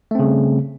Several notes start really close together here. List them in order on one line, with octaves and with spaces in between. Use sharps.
A3 C4 C#3 G3